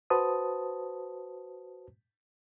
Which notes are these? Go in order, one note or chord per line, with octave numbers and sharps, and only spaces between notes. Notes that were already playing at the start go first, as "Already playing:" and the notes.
F#4 B4 C5 A5 D#6